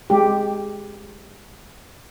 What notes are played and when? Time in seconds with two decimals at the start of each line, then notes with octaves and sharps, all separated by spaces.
0.10 G#3 G4